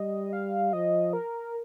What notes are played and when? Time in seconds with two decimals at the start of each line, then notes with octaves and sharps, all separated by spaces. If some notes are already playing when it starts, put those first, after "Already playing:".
Already playing: G3 D#5
0.33 F5
0.73 F3 D#5
1.13 A#4